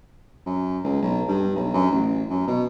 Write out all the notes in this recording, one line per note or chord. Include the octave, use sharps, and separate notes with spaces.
F#2
C#2
B1
G2
B1
F#2
A1
F#2
B2